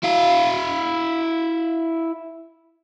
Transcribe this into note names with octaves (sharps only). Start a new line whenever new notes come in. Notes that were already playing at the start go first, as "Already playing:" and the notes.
E4 F5